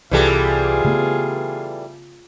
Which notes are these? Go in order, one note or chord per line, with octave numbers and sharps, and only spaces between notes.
C2 E3 G3 F4 G#4 A4
C#3 A3 B3